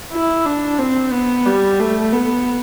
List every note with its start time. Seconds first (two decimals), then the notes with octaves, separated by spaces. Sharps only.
0.12 E4
0.45 D4
0.79 C4
1.13 B3
1.46 G3
1.79 A3
2.13 B3